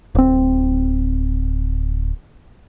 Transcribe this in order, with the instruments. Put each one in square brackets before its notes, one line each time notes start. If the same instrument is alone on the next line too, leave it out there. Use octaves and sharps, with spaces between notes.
[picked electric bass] D1 C4